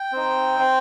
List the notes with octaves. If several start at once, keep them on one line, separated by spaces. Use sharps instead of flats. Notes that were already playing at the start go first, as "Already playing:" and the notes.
Already playing: G5
C4 D#4
C4